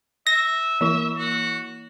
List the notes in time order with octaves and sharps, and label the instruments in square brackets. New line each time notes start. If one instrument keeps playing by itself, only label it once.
[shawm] E5 [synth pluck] A#6
[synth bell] E3 E4 E7
[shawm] F#4